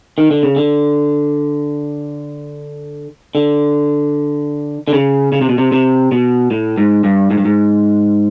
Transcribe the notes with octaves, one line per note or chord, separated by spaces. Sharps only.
D#3
D3
C#3
D3
D3
D3
C#3
C#3
C3
B2
C3
C3
B2
A2
G#2
G2
G#2
G2
G#2